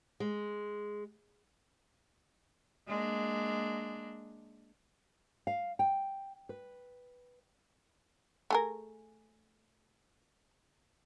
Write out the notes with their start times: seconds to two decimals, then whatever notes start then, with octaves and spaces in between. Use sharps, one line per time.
0.20 G#3
2.87 G#3 A#3 D4
5.47 F5
5.79 G5
6.49 B4
8.50 A3 G#4 A#4